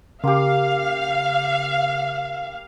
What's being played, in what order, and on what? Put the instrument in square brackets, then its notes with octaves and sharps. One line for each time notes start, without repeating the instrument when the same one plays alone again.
[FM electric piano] C#3 [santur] A#3 G4 [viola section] F5